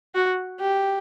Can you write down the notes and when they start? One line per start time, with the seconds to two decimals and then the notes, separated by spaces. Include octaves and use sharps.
0.15 F#4
0.61 G4